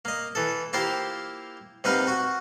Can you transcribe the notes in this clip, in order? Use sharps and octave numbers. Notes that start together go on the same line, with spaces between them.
A#3 D#5
E3 A4
A#3 E4 F4 G4 A#4 C5
C3 A#3 D#4 B4 F5 F#5
F#4 F#5